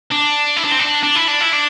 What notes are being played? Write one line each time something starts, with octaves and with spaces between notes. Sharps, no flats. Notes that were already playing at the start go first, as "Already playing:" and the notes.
D4
E4
D4
C4
D4
D4
E4
D4
E4
D4